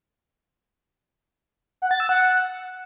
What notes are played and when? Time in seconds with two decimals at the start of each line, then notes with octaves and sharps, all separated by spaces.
1.82 F#5
1.91 A6
2.00 E6
2.09 F#5